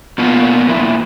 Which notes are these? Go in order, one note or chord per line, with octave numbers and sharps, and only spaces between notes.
B2 F3 A#3 B3 F4
F2 A#2 E4